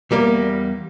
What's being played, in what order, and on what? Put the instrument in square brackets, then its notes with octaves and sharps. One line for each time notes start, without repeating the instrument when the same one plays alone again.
[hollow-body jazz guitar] E2 G3 A#3